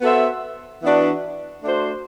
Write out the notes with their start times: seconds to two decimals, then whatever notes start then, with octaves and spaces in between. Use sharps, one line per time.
0.01 B3 F#4 A4 C5 E5
0.82 E3 B3 D4 F#4 B4
1.63 A3 D4 F#4 C5